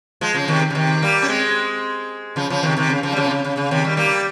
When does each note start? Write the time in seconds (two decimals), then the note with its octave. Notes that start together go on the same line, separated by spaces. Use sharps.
0.21 F3 G#3
0.34 C#3 F3
0.48 C3 D#3
0.71 C#3
0.75 C3 D#3
1.03 G3 A#3
1.22 C#4
1.28 G#3 C4
2.36 C#3 F3
2.50 C#3 F3
2.63 C3 D#3
2.77 C3 D#3
2.90 C#3
3.03 C#3 F3
3.13 G3
3.16 C#3 F3
3.25 C3
3.31 C#3
3.45 C#3
3.57 C#3
3.71 C3 D#3
3.84 D#3 G3
3.97 G3 A#3